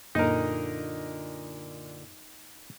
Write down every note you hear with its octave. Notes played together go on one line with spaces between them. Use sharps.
F#2 A#2 D3 D#4 A#4 D#5